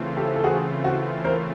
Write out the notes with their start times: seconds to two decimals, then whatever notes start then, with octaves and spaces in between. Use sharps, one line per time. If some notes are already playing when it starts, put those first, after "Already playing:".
Already playing: C#3 E3 A3 C4 F4
0.17 G4 A4
0.36 A4
0.44 F#4 G#4
0.84 F#4
1.24 A#4 C5